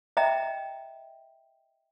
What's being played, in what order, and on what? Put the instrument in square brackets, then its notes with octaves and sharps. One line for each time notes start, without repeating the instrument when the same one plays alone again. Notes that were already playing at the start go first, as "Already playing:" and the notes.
[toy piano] D#5 E5 G5 A#5